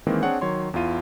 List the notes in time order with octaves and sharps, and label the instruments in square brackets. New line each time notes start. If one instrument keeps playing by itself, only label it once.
[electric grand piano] D#3 E3 G#3 A#3 C4
C4 D4 G#4 C#5 F#5
D#3 F#3 C#5 C6
E2 E4 F4 D#7